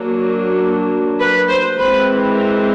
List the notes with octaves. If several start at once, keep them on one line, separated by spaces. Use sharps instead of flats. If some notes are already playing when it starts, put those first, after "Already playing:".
Already playing: F#3 A#3 D4
B4
C5
E3 G#3 C4 B4
A#4